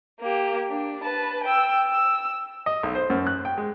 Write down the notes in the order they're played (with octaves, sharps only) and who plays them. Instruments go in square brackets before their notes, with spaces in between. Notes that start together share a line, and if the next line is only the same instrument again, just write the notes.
[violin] A#3 G4
D4
B4 A5
G5 E6
E6
[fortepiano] D#5
B1
C5
F#2
F#6
G5
G#3